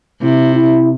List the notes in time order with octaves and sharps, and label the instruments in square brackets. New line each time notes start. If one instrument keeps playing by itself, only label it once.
[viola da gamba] C3 [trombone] E4
[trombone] E4